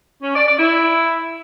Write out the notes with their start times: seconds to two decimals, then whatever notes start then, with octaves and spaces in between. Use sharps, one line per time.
0.23 C#4
0.35 D5
0.47 D5
0.59 E4